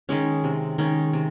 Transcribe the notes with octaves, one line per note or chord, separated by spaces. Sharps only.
D#3 G#3 C#4
C3
D#3 G#3 C#4
C3